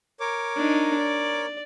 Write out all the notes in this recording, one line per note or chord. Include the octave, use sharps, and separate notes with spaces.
A#4 C#5 D6
D4 D#4
D5